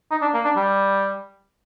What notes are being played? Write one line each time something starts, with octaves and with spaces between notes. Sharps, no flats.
D#4
D4
A#3
D4
G3